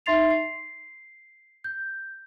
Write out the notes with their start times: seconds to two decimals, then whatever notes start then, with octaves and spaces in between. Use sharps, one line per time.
0.06 D#4 E5 C6 A6 C7 F7
0.31 C7
1.64 G6